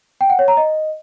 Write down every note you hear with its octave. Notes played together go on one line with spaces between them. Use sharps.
G5
F#5
C#5
A#5
D#5